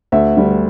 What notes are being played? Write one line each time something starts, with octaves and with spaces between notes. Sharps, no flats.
D2 E5
D3 G3